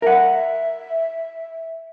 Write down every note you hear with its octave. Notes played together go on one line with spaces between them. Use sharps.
A#4 E5 F#5